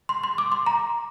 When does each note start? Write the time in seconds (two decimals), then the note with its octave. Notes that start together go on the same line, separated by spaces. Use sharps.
0.09 C6
0.24 C6
0.38 D6
0.52 C6
0.66 A#5